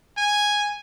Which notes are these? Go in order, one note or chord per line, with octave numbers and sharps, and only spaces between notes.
G#5